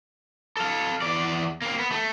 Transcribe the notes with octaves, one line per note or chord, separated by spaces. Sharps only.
A4 F5
E2 D5
A#3 C4
B3
A3